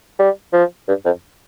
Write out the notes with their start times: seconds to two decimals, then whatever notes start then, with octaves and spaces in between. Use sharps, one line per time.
0.19 G3
0.53 F3
0.88 G2
1.05 F2